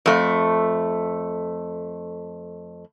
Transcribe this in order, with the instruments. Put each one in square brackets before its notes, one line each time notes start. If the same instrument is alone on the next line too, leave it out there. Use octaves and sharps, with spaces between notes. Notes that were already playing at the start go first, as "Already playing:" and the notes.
[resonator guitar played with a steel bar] F2 A3